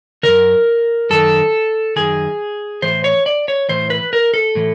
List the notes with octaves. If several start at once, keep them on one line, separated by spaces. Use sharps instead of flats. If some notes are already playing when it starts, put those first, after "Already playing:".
F#2 D#3 A#4
F#2 D#3 A4
F#2 D#3 G#4
A2 E3 C5
C#5
D5
C#5
A2 E3 C5
B4
A#4
A4
A2 E3